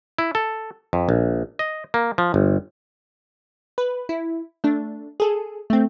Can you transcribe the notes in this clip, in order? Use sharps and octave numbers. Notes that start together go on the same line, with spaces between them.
E4
A4
F2
A#1
D#5
A#3
F3
G1
B4
E4
A3 D4
G#4 A4
A3 C4